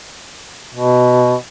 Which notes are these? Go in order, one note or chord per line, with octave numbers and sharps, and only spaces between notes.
B2